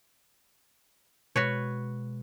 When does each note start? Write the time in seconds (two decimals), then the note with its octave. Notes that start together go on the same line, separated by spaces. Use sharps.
1.36 B2 G#3 F#4 B4 C#5